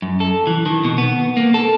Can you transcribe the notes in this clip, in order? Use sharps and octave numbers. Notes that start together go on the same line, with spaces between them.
F#2
A4
E3
D#3
B2
B3
A#3
A4